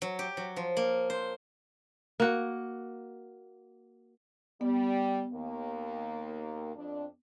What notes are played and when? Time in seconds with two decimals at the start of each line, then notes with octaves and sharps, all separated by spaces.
0.02 F#3
0.19 G4
0.37 F#3
0.56 F3
0.77 A#3
1.10 C5
2.20 A#3 F#4
4.61 G3 B3
5.33 D#2 A#3
6.76 F2 D4